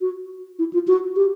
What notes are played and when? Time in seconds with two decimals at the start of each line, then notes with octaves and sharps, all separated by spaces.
0.01 F#4
0.59 E4
0.73 F4
0.88 F#4
1.16 G4